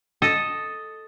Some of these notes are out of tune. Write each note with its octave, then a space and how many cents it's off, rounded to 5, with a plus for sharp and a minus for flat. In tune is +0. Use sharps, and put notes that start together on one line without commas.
A4 +0 D#5 +0